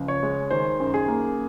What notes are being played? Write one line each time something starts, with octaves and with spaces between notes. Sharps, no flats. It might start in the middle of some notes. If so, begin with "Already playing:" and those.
Already playing: C#2 F3
C#5
G#3
D#3 C5
F#2
G#4
A#3